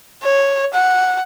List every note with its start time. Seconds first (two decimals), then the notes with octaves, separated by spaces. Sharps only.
0.23 C#5
0.74 F#5